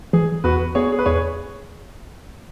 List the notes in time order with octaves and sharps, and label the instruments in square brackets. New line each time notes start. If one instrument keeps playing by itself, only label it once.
[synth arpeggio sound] E3 [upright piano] G#4
[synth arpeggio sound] E2 [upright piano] F#4 B4
[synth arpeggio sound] B3 [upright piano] G#4 C#5
[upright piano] G#4
B4
[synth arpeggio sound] E2 [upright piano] G#4 C#5